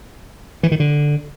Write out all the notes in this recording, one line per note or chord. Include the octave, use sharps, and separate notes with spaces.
E3
D#3
D3